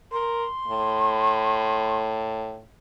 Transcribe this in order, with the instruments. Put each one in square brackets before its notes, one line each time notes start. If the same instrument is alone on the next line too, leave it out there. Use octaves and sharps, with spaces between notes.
[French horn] A#4 [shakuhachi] C6
[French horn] A2